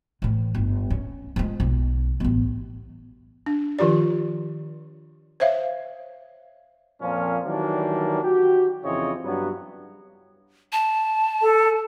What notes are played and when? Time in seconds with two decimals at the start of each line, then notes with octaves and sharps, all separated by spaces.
0.22 A2 E3
0.55 G1
0.90 C#4
1.36 F3 G#3
1.60 B1
2.20 A1 B3
3.46 D4
3.79 D#3 F3 F4 G4 D5
5.40 C5 C#5 E5 F5
7.01 F2 A#2 F3 A#3 C#4 F4
7.45 D#3 E3 F#3 G3 A#3 D4
8.23 F#4 G4
8.84 F2 C#3 E3 C4 C#5 D#5
9.24 G2 F#3 B3
10.72 A5
11.42 A4